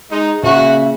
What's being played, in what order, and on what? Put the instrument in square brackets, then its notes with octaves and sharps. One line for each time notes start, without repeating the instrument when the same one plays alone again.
[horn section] G#3 D#4
[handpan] A#2 [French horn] C#3 [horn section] F#4 [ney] E5